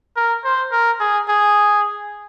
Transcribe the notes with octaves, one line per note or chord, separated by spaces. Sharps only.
A#4
C5
A#4
G#4
G#4